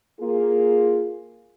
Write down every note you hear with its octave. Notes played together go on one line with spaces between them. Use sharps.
A#3 F4 G#4